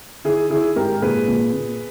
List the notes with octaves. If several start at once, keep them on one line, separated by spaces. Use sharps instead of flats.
D#3 E4 G#4
D#3 E4 G#4
G#2 G4 A#4
A#2 G#4 B4
A#2
A#2